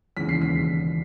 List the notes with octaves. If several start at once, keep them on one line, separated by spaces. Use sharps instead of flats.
E1 D#2 C#3 E3 B6
C7
B6